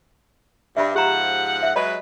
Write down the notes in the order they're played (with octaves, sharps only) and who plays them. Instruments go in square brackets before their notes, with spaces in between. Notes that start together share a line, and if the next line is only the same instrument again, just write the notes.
[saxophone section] G2 [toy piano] E5 B5
[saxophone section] G#2 F3 F#5 [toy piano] G4 A#5
[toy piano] E5
[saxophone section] F#3 G#3 B4 [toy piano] C#5 D#5 B5